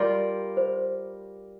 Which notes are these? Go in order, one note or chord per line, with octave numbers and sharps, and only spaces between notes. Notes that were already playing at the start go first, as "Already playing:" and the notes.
Already playing: G3 F4 A#4 D5
C5